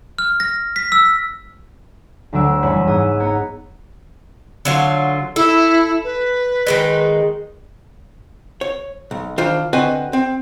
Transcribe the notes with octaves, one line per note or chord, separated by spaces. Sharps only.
F6
A#6
B6
E6
D2 D3 F#3 E6 D7
F#1 E2 G3 C#5 B5 E6
G#2 B3 D#6 E6 G#6
B3 A#5 G#6 C#7
D3 F#3 F4
E4 A4
B4
D#3 G#3 D#4
C#5
B1
D#3 D4 F4 C5
D3 C4 F#4 B4 D#5 G#5
C4